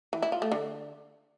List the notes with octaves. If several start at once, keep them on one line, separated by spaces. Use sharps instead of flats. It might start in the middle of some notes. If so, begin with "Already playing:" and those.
E3
E4
F4
A3
D3